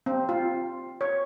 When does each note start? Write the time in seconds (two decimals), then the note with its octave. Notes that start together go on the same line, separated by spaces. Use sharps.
0.06 C4
0.29 F4
1.01 C#5